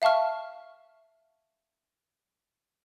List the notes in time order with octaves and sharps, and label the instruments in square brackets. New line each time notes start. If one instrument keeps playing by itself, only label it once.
[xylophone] E5 F5 A5 C#6 F6